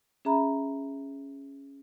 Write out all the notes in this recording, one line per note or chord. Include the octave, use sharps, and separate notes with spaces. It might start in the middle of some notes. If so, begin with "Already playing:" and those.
C#4 G#4 E5 A#5 B5